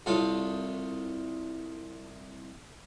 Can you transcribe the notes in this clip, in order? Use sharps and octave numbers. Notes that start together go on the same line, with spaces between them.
C2 F4 A4 C#5